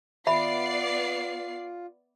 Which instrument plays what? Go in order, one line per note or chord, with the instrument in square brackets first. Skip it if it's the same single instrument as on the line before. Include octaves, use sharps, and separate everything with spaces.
[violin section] B3 D5 C7 [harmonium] F4 [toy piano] E5 B5